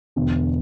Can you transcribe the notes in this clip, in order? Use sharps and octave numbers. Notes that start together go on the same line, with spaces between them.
E1 E2 D3